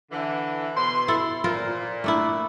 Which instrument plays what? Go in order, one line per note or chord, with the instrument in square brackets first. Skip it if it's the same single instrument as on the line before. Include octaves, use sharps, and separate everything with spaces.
[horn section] D3 E3
B2 C6
[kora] E4 A4
[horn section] A#2 [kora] F4 A#4 C5
[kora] A3 D4 E4